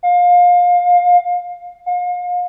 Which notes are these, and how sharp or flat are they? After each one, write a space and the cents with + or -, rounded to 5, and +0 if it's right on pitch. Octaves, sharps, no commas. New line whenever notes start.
F5 +25
F5 +40